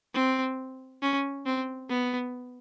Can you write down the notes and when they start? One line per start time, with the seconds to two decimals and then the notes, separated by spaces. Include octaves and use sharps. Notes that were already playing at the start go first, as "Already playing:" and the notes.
0.14 C4
1.02 C#4
1.46 C4
1.89 B3